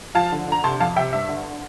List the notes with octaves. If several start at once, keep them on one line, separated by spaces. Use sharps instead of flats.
F3 F5 A5
D3
D3 A#5
C3 A5 C6
F2 F5 A5
C3 E5 G5
G2 E5
D3